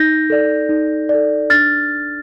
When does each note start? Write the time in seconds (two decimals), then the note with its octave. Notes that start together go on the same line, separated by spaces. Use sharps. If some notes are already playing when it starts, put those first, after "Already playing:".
Already playing: D#4 G6 A#6
0.30 A4 D5
0.69 D#4
1.09 A4 D5
1.50 D4 F6 A6